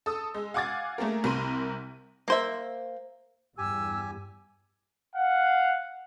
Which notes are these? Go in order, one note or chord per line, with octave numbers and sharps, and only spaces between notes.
A4 D#6 E6
G#3
F5 F#5 G#5 D6 G#6 A6
A3 A#3 G#4 A#4
C2 C3 A#4 B5 C6 D#7
A#3 C5 E5
E2 G2 G4 G#5 E6
F5 F#5